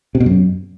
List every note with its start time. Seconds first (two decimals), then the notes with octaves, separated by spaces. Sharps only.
0.15 C3
0.20 B2
0.26 F#2